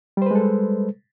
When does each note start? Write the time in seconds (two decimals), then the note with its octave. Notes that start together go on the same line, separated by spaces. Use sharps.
0.17 G3
0.22 C5
0.26 B4
0.31 G#3
0.35 A4